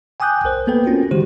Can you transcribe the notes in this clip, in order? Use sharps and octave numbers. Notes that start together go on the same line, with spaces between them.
G5 G#5 D6 D#6 F#6 G6
B1 A#4 C5
A#3 B3 A4 B4 G5
C4 C#4 F4 F#4 A#4
D3 D#3 G#3 F#4 G4 C5